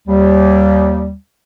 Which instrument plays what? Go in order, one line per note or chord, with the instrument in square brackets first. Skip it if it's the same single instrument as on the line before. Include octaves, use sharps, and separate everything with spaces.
[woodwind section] D#2 G3